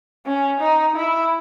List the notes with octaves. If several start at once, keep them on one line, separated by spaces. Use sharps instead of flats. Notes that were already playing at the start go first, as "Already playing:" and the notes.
C#4
D#4
E4